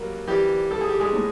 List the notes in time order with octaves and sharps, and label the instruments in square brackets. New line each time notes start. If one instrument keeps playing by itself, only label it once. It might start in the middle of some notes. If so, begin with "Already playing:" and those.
Already playing: [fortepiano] F#3 G3 A#3
E3 G3 G4
G3 A4
G#4
G4
G#3 G#4
A2